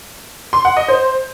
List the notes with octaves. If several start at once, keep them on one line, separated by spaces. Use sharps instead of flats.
C6
F#5
D#5
C5